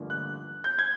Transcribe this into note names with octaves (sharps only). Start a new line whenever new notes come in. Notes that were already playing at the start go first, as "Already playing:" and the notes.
Already playing: A1 G2 D3 F3 A#3
F#6
G6
G#6